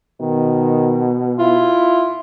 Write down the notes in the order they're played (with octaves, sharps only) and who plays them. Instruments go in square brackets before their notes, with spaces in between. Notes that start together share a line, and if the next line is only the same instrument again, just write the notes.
[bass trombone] B2 [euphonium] D#3
[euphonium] E4 [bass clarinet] F4